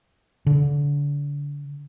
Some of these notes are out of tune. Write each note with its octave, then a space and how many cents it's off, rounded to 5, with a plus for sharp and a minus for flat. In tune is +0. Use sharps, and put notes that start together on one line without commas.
D3 -30